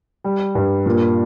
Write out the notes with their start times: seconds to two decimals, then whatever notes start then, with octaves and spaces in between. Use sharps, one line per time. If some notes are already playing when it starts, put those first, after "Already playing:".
0.24 G3
0.55 G2
0.86 A#2